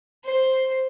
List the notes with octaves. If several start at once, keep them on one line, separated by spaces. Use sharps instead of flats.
C5